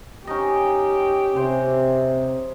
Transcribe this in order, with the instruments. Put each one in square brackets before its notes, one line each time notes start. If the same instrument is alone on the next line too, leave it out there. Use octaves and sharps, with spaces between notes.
[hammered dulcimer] C#4 D#4 D#5 [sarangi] G4
[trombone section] C3 [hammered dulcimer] G#4 C5